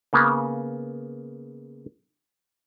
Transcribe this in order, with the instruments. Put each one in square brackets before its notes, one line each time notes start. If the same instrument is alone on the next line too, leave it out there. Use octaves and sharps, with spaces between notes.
[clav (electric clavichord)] C#3 A#3 B3